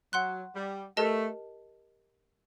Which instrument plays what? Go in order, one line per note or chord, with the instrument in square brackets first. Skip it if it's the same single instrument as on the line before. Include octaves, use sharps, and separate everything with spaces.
[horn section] F#3 [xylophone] F#5 C6 F#6
[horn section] G3
[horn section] A3 [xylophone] G4 A#4 D#5 A5